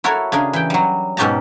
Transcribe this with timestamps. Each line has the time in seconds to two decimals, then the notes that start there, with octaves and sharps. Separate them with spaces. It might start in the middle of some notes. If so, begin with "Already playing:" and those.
0.04 E4 F#4 A4 A#4 C#5
0.32 C#3 D4 G#4 A#4
0.53 E3 G5
0.70 F#3 G3
1.17 G#2 B2 C#4 G4 A5 A#5